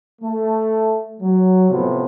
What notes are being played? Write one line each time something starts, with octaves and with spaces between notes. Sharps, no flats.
A3
F#3
A2 C3 F3 B3